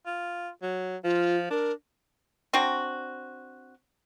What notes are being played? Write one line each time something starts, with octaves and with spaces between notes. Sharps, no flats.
F4
F#3
F3 F4
D4 A#4
C4 D4 F#4